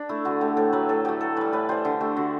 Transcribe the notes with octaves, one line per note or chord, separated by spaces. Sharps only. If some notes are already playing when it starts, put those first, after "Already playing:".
Already playing: D4
A3 E4
D3 F#4
A3 G4
A2 A4
F#3 A3 B4
A2 A4
F#3 A3 G4
A2 A4
E3 G3 B4
A2 B4
E3 G3 C5
D3
A3 G4
D3 F#4